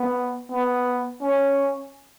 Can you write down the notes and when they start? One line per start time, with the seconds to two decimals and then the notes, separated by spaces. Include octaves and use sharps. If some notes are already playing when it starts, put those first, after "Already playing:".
Already playing: B3
0.51 B3
1.21 C#4